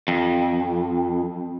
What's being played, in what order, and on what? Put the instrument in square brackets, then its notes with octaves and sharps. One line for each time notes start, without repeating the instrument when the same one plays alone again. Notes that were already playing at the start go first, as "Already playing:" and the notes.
[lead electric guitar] F2